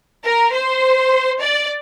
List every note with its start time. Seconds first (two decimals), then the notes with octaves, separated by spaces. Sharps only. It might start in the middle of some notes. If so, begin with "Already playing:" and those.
0.24 A#4
0.53 C5
1.41 D5